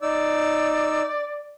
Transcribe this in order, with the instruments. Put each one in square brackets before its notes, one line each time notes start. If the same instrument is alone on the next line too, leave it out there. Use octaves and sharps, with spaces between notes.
[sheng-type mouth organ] D#4 E6 [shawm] D5